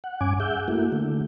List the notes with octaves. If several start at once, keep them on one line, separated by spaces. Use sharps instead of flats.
F#5
G2 C#4 G#5 D6
G#4 E5 F#5 G6
A3 A#3 E4 F#4
D3 A3